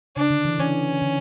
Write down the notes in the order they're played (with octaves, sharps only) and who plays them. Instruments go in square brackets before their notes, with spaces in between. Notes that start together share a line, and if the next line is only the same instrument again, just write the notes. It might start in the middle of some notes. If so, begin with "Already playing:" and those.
[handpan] C#3 [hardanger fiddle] D4
[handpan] D3
E3
[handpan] E3 [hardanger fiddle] C#4
[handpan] D3